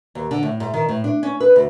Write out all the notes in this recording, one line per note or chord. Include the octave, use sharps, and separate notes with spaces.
D#2
D3
A2
G#2
D#3
A2
D4
C#4
B4
D2